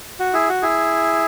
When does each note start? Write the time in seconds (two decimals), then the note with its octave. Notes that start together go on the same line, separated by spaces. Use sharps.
0.20 F#4
0.34 E4 G#4
0.49 F#4
0.62 E4 G#4